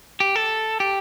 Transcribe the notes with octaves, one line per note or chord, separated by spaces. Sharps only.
G4
A4
G4